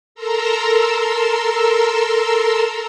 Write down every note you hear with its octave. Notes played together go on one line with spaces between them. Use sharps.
A4 A#4 A#5 C6 E6